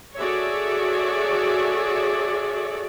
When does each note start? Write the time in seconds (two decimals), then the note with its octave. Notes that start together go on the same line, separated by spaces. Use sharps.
0.16 F#4 G#4 A4 C#5 D5 E5